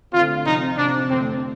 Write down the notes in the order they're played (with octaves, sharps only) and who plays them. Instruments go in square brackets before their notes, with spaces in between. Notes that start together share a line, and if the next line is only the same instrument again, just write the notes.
[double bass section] D3 A3 C4 [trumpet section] F4
[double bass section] C3 F3 C4 [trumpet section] D#4
[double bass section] C3 F3 C4 [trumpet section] D4
[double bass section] F2 D3 A3 [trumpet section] C4